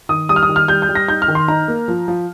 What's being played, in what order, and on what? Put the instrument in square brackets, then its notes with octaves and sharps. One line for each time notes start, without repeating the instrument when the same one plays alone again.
[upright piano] D#3 D#6
G3 D#6
F6
D#6
D#3
F6
G3 G6
G6
G3
A#6
D#4 G6
F6
D#3
C6
D#4 A#5
A#3
F3
F3